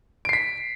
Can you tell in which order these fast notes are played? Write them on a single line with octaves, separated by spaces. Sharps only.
D7 C7 B6